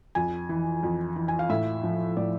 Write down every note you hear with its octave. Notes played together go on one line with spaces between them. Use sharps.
F2 G#5
E3
F2
E3
G#5
F5
A2 E5
F3
A2 D5